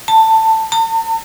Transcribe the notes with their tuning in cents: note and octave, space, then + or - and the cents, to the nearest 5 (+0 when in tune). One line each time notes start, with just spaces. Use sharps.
A5 +15
A5 +45